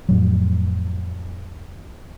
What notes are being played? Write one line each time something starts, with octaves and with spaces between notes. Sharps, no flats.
F2 A2 F#3